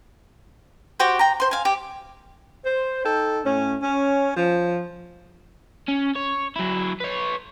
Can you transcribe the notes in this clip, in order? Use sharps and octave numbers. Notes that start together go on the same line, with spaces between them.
F#4 G4 C5 G5
G5 A#5
C5 C6
F5 G#5
G4
C5
D#4 A4 G5
A2 C#4
C#4
F3
C#4
C#5
F#3 E4
B4 C#5